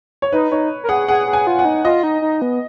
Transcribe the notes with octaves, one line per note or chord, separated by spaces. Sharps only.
C#5
D#4 B4
D#4 C#5
A#4
G#4 F#5
G#4 F#5
G#4
G#5
F4
F#5
D#4
F4 D#5
D#4
D#4
B3